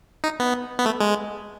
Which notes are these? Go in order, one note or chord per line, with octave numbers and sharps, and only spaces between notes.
D#4
B3
B3
A3
G#3